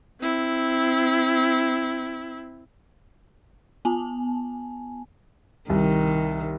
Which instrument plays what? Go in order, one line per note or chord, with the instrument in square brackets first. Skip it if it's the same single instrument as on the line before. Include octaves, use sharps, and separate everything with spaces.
[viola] C4 E4
[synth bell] B3 G#5 A5
[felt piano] C2 [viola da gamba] D#3